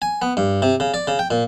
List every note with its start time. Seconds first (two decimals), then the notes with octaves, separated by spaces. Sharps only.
0.02 G#5
0.22 B3
0.37 G2
0.62 C3
0.80 C#3
0.94 D5
1.08 C#3
1.19 G5
1.31 A#2